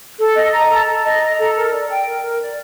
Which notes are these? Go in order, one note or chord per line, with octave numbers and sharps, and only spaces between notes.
A4
D#5
A#5
A4
A4
D#5
A#5
A4
A#4
D5
G5
A#4
A#4
D5